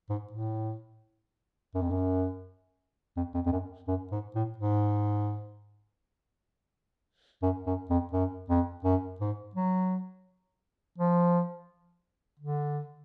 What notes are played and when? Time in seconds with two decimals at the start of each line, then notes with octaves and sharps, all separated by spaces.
0.09 G#2
0.33 A2
1.74 F#2
1.82 F2
1.91 F#2
3.17 F2
3.34 F2
3.46 F2
3.52 F#2
3.88 F#2
4.12 G#2
4.35 A2
4.58 G#2
7.42 F#2
7.66 F#2
7.90 F2
8.13 F#2
8.49 F2
8.84 F#2
9.20 G#2
9.55 F#3
10.98 F3
12.39 D3